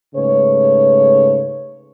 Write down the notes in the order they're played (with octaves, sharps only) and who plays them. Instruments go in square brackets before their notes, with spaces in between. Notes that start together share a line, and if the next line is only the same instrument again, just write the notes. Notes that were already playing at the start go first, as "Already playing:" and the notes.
[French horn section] G#2 C#3 A3 B4 C#5